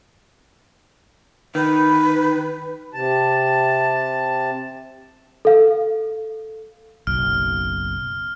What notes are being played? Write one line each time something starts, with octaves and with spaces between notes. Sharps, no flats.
D#3 B4
C3 A5
A4 F5
F#1 B1 F6